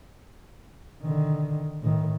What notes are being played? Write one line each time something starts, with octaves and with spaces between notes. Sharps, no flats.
D3 D#3
A2 D#3